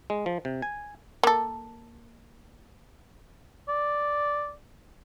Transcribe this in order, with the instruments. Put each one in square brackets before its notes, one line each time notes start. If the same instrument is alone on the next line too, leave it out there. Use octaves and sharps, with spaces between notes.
[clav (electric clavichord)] G#3
F3
C3
G#5
[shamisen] A#3 A4
[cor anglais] D5